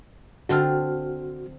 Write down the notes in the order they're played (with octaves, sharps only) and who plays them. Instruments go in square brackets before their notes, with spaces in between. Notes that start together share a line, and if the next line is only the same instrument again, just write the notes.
[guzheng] D3 C4 F4 [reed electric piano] F#4 F6